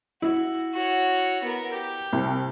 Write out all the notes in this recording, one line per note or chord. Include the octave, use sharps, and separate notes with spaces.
E4 F#4
F#4 C#5
B3 A#4
G4
C2